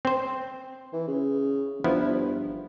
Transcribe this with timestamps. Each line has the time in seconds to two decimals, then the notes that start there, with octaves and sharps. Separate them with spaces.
0.05 C4 C5
0.93 E3
1.07 C#3
1.84 G1 F3 B3 E4